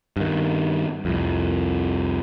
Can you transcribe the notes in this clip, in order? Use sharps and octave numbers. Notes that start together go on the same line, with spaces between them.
G2 D#3
C2 F2